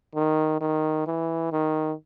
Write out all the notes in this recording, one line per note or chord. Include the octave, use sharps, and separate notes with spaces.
D#3
D#3
E3
D#3